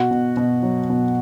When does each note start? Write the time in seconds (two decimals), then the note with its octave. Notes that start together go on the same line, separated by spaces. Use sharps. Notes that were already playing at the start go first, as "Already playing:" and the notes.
Already playing: B2 F#4
0.11 B2
0.37 B2
0.63 F#3
0.90 B2